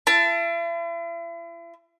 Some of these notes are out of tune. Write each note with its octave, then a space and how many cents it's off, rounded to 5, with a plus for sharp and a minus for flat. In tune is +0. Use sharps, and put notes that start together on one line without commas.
E4 +40 A5 +0